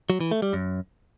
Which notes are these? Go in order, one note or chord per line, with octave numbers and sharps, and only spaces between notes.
F#3
E3
A3
G3
F#2